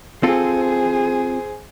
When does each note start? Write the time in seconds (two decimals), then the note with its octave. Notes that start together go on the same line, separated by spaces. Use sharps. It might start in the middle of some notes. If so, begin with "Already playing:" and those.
0.23 C4 F4 G#4 A4 C5